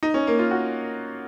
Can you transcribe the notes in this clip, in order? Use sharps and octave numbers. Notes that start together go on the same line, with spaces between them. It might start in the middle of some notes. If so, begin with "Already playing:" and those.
D#4
C#4
A#3
F4
F#4